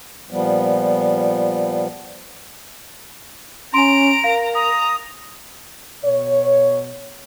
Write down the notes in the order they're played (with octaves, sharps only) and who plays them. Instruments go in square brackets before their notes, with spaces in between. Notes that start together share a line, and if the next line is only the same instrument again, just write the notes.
[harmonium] A#2 F3 G3 B3
[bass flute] C#4 [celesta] G#5 C6 [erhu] A#5 [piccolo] D7
[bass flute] A#4 [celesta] F5
[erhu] A#5 [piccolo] D#6
[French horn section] B2 C#5